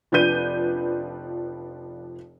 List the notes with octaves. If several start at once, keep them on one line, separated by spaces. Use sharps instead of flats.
F1 F3 D4 B4 G6 D#7